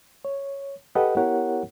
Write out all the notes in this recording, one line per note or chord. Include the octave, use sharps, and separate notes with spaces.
C#5
G4 A4 B4 D#5 F#5 G5
B3 E4 G4 A#4 C#5 F#5